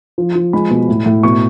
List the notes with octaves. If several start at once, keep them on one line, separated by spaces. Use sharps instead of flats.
F3
F3
G#3 B5
B2
A2
A2
B2 C#6